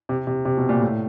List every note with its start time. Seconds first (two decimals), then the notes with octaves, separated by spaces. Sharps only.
0.09 C3
0.27 C3
0.45 C3
0.57 B2
0.69 A#2
0.82 A2